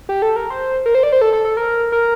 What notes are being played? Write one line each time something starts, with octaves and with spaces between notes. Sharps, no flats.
G4
A4
A#4
C5
A#4
C5
D5
C5
A4
A4
A4
A#4
A#4